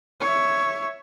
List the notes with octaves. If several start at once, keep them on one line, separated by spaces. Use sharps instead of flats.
C#5 E5